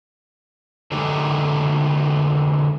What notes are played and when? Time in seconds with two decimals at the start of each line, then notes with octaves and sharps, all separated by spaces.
0.92 D3 G#3 A3 D#4 G4